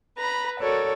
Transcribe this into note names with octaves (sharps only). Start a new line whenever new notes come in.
B4 A#5 B5
F#4 A4 A#4 C#5 D5